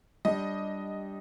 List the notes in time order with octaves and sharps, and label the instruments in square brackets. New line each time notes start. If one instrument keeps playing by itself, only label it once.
[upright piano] G3 D4 G4 [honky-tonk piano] D#5